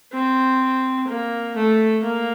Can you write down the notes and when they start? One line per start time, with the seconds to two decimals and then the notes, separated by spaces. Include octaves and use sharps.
0.13 C4
1.08 A#3
1.55 A3
2.03 A#3